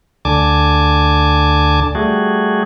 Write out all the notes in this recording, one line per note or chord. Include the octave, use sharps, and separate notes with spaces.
D2 D3 G#5 A5 D6
G3 A3 F#4 G#4